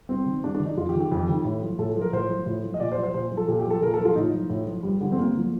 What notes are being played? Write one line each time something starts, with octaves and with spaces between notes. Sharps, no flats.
G2 C4
D#3
G2 D4
D4
D#3
D#4
F2 F4
G4
D#3
G4
F2
D#3
A2
F3
A2 A4
F3
A#4
A2 C5
F3
A2
F3
D#5
A#2 D5
C5
F3
C5
A#2 C5
F3
A4
A#2 G4
G4
F3 A4
A#2 A#4
A4
F3
F4
A2 D#4
F3
A2
F3
G2 G3
D3 F3 G3
C4
G2 A#3
D3 F3